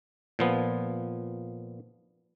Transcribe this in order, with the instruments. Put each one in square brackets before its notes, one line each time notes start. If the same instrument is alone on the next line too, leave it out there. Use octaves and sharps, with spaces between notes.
[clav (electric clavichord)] A#2 F3 B3